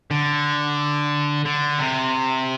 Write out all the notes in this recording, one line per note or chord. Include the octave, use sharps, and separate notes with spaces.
D3
D3
C3